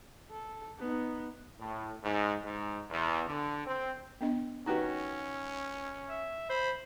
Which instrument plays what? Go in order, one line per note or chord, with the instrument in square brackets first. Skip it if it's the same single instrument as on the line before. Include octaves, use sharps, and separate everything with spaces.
[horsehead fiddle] A4
B3 D#4
[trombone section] A2
G#2
G#2
E2
D3
C4
[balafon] B3 D4 D#5
[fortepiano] D#3 F#4 G4 [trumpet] C#4 [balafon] B4 F#5 A#5
[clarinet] E5
[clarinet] C5 [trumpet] B5